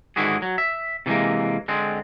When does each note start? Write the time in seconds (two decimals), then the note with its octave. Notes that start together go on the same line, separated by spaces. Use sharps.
0.16 G#2 D3 D#3 E4 F#4 G#4
0.42 F#3
0.58 E5
1.06 C3 E3 F#3 G#3 A#3
1.68 D3 G#3 C4